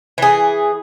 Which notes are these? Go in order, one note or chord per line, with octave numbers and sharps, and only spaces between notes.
E3 G#4